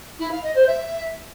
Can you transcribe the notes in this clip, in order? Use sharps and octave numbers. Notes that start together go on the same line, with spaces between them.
E4
F5
D#5
C5
E5